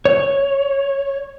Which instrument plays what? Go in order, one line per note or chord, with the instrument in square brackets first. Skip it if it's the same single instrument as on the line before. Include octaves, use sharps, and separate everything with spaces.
[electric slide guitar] C#5